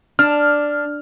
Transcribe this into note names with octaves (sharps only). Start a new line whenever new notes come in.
D4 F6